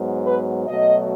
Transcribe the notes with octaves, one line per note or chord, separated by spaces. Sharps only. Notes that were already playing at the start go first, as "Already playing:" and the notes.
Already playing: G#2 F#3 B3
B4
B2 F#3 A3 D#5